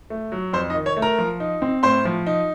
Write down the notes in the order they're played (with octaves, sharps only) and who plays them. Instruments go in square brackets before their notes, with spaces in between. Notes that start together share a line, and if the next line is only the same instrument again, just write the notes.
[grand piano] A3
F#3
F2 C5 C6
D#4 D#5
D#3
C#5
A3
A#4 A#5
F3
D#4
C4
A2 C5 C6
F3
D#4